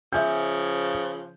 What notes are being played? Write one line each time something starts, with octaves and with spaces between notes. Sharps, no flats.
C#3 F3 E5 G#5 G6